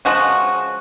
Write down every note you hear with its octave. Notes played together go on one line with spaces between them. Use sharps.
C#3 F3 G#3 F#4